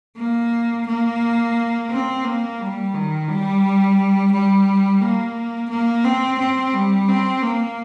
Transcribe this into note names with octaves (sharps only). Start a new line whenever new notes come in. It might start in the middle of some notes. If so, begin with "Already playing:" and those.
A#3
A#3
C4
A#3
G3
D#3
G3
G3
A#3
A#3
C4
C4
G3
C4
A#3